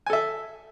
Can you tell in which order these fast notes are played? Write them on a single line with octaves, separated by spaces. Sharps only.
G#5 A4 E5